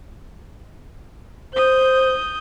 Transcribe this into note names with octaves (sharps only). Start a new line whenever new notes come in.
C5 D#6 G6